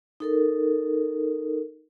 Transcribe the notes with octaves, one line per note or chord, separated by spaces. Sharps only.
D#4 A4 A#4